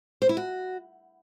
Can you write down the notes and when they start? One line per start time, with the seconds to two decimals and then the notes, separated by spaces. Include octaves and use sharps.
0.22 C5
0.29 E4
0.37 F#4